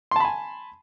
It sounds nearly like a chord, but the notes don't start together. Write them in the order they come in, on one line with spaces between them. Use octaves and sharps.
C6 A5 B5 G#5